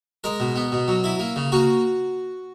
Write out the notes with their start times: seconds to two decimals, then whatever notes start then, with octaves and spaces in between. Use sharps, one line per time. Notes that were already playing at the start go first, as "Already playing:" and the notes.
0.24 G#3 A#4
0.40 B2
0.56 B3
0.72 B2
0.88 F#3
1.04 E4
1.20 A#3
1.36 C#3
1.52 A#3 F#4